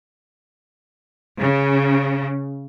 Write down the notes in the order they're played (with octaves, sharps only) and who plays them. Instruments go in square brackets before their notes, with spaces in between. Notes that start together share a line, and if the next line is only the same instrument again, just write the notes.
[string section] C#3